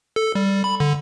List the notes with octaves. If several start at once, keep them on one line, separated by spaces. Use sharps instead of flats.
A4
G3
B5
D3